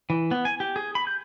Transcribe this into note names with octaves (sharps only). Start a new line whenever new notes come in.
E3
B3
G#5
G4
G#4
B5
G6